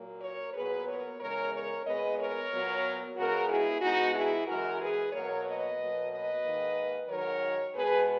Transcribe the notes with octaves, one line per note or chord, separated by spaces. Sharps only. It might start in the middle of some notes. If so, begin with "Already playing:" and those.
Already playing: A#2 F#3 A#3
A#4 C#5
A#2 F#3 B3 G#4 B4
A#4 C#5
E2 C#3 G#3 A#4 C#5
A#4 C#5
A#2 G#3 B3 B4 D#5
A#4 C#5
A#2 F#3 B3
C#3 G#3 B3 F#4 A#4
E4 G#4
B2 G#3 B3 D#4 F#4
E4 G#4
F#2 E3 G#3 F#4 A#4
G#4 B4
B2 F#3 A#3 A#4 C#5
B4 D#5
B2 F#3 A#3
B4 D#5
G#2 D#3 A#3
G#2 D#3 F#3 A#4 C#5
B2 G#3 B3 G#4 B4